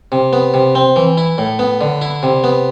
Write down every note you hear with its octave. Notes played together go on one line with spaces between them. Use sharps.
C3
B3
C3
C4
E3
E4
A2
B3
D3
E4
C3
B3